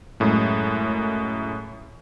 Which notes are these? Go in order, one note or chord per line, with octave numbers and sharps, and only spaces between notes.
F#2 A2 G#3